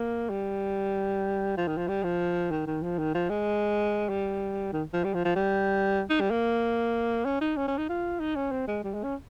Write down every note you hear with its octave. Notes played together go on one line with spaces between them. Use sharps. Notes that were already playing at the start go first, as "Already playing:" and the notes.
Already playing: A#3
G3
F3
D#3
F3
G3
F3
D#3
D#3
F3
D#3
F3
G#3
G3
D#3
F3
G3
F3
F3
G3
D#4
G3
A#3
C#4
D#4
C#4
C#4
D#4
F4
D#4
C#4
C4
G#3
G3
G#3
C#4